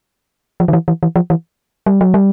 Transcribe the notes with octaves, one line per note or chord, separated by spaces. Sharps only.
F3
D#3
E3
E3
E3
F3
E3
G3
F#3
G3